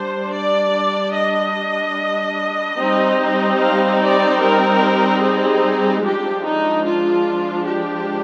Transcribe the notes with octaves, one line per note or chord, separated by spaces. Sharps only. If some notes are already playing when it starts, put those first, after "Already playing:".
Already playing: G3 D4 C5
D5
D#5
G3 C4 D#4
F5
D5
A#4
G#4
F3 G#3 D4 G4
D#4
F4
G4